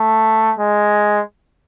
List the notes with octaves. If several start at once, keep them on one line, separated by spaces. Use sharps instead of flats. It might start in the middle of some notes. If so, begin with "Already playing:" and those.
Already playing: A3
G#3